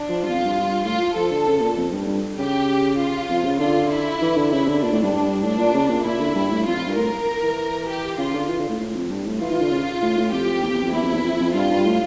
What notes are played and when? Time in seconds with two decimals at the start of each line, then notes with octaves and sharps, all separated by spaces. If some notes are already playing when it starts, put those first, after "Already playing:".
Already playing: D4
0.09 F3
0.23 G2 F4
0.29 E2
0.34 F2
0.44 G2
0.85 A2 F4
1.15 F3 A4
1.31 D3
1.47 C#3
1.61 A#2
1.76 F2
1.92 G2
2.07 G2
2.37 C#3 G4
2.98 F4
3.29 F2
3.45 C#3
3.59 D3 F4
3.91 E4
4.21 E3
4.37 D3
4.52 C#3 E4
4.67 D3
4.82 A#2 D4
4.92 A2
5.02 G2
5.13 G2
5.43 A2 D4
5.58 A#2
5.74 C#3
5.89 A#2
6.04 A#2 E4
6.19 D3
6.35 G2
6.51 A2
6.66 F2 F4
6.76 F2
6.86 G2
6.96 A2 A#4
7.43 E3
7.88 G4
8.18 C#3 F4
8.34 D3
8.49 E3
8.60 D3
8.69 A2
8.80 A2
8.95 F2
9.10 G2
9.26 A2
9.40 E3 F4
9.51 E3
9.61 D3
9.71 C#3
10.02 A2
10.17 A2
10.32 F2 G4
10.63 E2
10.73 E2
10.83 F2
10.93 E2 E4
11.03 F2
11.14 E2
11.24 F2
11.40 F2
11.54 G2 F4
11.70 G2
11.85 A2